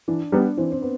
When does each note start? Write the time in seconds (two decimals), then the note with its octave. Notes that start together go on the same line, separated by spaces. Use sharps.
0.08 E3 D4
0.32 G3 B3 D4
0.57 E3 C4
0.72 C4
0.82 B3